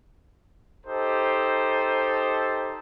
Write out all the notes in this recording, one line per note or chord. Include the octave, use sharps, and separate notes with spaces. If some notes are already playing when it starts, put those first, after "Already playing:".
D#4 G4 A4 C5